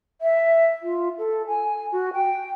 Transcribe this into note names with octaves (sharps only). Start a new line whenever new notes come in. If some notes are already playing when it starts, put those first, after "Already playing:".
E5
F4
A4
G#5
F#4
G5